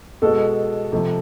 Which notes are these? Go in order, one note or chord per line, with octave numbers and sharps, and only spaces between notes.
B2 G#3 A4
C3 F3 A3